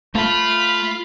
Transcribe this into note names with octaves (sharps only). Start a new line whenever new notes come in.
A3 F4 B5